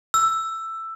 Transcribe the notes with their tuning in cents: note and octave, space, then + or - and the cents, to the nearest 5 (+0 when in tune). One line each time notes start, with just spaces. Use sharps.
E6 +10